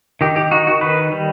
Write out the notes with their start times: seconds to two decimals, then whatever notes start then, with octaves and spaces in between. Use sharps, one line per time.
0.21 D#3 G4
0.36 G4
0.51 D#4 F#4
0.67 F#4
0.81 D#3 B4
1.12 G3